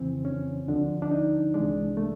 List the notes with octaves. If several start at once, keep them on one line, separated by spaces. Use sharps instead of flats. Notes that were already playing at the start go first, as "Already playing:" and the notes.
Already playing: F2 C#3 E3 C4
C#4
D2 D3 F3 D4
D4
D#4
C2 C3 E3 G#3 D4
A3